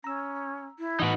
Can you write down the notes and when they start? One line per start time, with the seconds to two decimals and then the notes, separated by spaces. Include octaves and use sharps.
0.04 C#4 A#5 E6
0.79 E4
0.99 A2 E3 D#4 F#4 B4